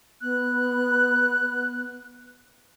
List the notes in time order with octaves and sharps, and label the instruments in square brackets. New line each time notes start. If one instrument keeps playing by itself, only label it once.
[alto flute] B3 [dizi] F#6